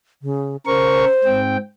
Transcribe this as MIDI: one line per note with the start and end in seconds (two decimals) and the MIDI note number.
0.22 0.57 49
0.66 1.05 49
0.66 1.05 70
0.66 1.41 72
0.66 1.05 85
1.24 1.57 44
1.24 1.57 60
1.24 1.57 79